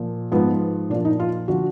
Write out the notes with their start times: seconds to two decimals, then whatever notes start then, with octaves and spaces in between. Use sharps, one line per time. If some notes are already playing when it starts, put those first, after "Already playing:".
Already playing: A#2 F3
0.32 G#2 F3 B3
0.90 A#2 D4
0.94 F3
1.05 D#4
1.20 F4
1.48 D3 F3 F#4